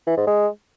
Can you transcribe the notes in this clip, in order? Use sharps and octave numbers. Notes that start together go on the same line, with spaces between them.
E3
G#2
G#3